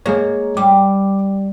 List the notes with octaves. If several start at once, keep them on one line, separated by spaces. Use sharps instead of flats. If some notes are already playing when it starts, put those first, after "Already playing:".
G#3 A#3 G#4 C#5
G3 D6